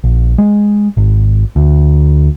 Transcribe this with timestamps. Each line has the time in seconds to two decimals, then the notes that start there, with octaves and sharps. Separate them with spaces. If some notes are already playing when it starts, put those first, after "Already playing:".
0.04 A#1
0.38 G#3
0.97 G#1
1.56 D2